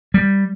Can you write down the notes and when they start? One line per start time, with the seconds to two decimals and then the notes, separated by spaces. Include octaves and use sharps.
0.14 G3